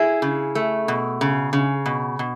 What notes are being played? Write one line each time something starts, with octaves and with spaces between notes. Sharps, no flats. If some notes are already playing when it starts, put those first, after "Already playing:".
Already playing: E4 G#4
C#3
A3
B2
C#3
C#3
B2
B2